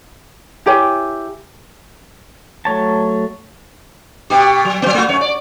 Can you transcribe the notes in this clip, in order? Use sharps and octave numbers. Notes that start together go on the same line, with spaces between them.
E4 G4 C#5 G#5
F#3 A3 C#5 A5
B2 G4
F#3
F#3 B3
A3 F#4
F#2 C#5
D5